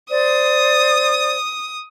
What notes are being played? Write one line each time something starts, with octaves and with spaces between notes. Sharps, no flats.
C5 D5 D#6